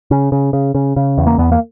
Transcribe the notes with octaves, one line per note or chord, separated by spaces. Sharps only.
C#3
C#3
C#3
C#3
C#3
E2
A#3
E2 B3
A#3